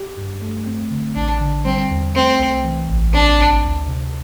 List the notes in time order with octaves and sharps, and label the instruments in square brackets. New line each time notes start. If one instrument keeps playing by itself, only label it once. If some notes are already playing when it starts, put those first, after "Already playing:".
Already playing: [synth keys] G4
G2
A3
C4
D3
[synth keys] A1 [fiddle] D4
[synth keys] D3
[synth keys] G3 [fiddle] C4
[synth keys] E2
[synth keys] A3 [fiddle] C4
[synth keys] C2
E3
A1
[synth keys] C4 [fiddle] D4
[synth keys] G1
D2
C3